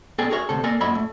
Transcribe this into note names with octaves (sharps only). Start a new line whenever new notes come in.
B3 G#4 A4 D5 G5 G#5
F#4 G#4 A#4 C#5 E5
D2 C3 A4
A#3 A4 A#4 D5 G#5
F#2 A#2 C#5 D#5 E5 B5
A3